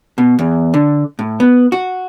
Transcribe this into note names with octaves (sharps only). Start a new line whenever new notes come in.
B2
E2
D3
A2
B3
F#4